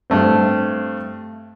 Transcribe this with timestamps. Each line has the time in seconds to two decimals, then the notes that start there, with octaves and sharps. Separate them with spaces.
0.10 G2 A3 C4